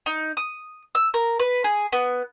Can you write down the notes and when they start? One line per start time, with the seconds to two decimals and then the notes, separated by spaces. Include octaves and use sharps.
0.06 D#4
0.37 D#6
0.95 E6
1.14 A#4
1.40 B4
1.64 G#4
1.92 B3